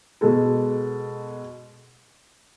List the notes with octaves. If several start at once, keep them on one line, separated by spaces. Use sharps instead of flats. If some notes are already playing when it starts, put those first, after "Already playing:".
B2 G#3 A4